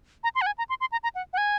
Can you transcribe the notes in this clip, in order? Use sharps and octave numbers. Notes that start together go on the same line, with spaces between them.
A#5
C6
F#5
G#5
A#5
C6
C6
A#5
A#5
F#5
F#5
G#5